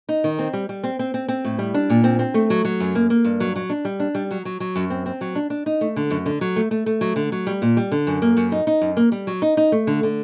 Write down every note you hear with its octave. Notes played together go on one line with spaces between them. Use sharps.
D#4
D#3
C4
G3
G3
C4
C4
C4
C4
A2
G3
D4
A#2
C4
C4
A3
F#3
F#3
F#2
A#3
A#3
G2
F#3
F#3
D4
G3
D4
G3
F#3
F#3
F#3
F#2
C4
C4
F#3
D4
D4
D#4
A3
D3
F#2
D3
F#3
A3
A3
A3
F#3
D3
F#3
G3
A#2
G3
D3
F#2
A#3
F#2
D#4
D#4
F#2
A#3
G3
F#3
D#4
D#4
A3
D3
D3